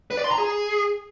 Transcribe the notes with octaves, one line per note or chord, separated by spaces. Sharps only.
B4
D5
C6
A#5
G#4